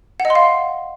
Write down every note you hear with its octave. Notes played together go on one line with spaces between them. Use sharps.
F#5
D#5
C6
F5